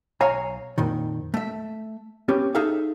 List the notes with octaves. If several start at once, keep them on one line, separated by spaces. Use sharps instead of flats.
B1 C#5 F5 G#5 A#5
F2 A#2 D#3
A3 E5
B3 C#4 G4
D#4 G#4 A4 E5 F5